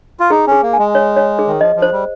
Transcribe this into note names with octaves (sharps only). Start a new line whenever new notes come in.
F4
D#4 G#4
C#4 G#4
A#3
G#5
G#3
C#5
C#5
G#4
D#3
F3 D#5
F3
C5
G3